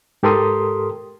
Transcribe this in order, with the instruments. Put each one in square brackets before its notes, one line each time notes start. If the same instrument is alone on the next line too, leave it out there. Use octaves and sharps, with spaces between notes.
[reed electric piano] G#2 G4 A4 A#4 C6 D#6